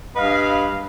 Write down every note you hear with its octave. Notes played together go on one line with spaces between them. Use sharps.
G2 B4 D#5 F5